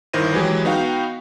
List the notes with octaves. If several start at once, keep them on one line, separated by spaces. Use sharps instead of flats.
G1 D#3 E4 C5 A#6 D#7
E3 F#3 G#3 G4 G#4
B3 D#4 F#4 F5 G5